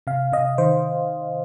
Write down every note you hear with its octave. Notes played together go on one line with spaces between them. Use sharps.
C3 F5
C3 D#5
D#3 C5